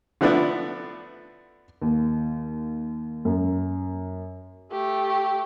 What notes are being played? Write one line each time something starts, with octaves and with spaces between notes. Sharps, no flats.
D3 F3 A3 B3 D4 E4
D#2
F#2
A3 G4